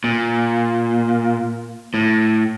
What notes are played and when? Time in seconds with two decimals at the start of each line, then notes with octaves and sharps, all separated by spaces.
0.04 A#2
1.94 A2